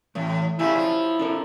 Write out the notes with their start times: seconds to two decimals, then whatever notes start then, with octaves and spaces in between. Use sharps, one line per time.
0.15 A2 E3 A3
0.59 A#2 C#3 A3 E4 G4 E5 G#5
0.76 F3
1.19 D4 A4 A#4